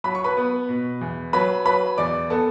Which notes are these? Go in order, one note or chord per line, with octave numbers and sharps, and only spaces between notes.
F#3 B5
C#6
B4 B5
B3
B2
E2
F#3 B4 B5
F#3 B4 B5
E2 D5 D6
B3 A4 A5